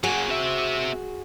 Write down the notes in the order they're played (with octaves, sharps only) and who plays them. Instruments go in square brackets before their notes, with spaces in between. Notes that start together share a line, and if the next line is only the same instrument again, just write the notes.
[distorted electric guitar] F#3 A#3 [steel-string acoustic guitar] F#4 G#4
[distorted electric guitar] C4 E5